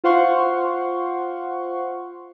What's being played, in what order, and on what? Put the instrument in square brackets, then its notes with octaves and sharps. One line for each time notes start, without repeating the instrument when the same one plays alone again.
[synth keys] F4 C5 F5 F#5 C6 C#6